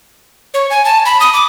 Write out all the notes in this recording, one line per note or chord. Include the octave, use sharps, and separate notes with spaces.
C#5
G#5
A5
B5
D#6
D6